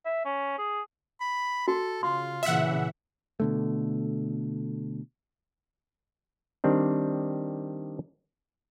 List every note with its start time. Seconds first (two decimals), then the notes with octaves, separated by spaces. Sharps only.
0.05 E5
0.25 C#4
0.58 G#4
1.21 B5
1.68 F#4 A4
2.03 C#3 F4 C6
2.43 A#2 C#3 E3 E5 F#5
3.40 B2 D3 A3
6.64 D#3 G3 C4 D4